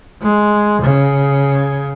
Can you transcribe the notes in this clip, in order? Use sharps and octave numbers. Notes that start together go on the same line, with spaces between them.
G#3
C#3